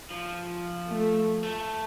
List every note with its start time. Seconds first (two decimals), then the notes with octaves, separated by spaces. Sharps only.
0.11 F3
0.90 A3
1.43 A3